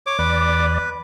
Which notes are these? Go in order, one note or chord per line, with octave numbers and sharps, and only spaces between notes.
C#5 D6
E2 B4 D5